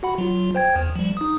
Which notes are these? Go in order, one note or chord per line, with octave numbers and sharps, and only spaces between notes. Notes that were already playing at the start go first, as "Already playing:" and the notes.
F#4 F#5 B5
F#3 F4
C5 G5 G#6
E2
F3 G3
D#4 D#6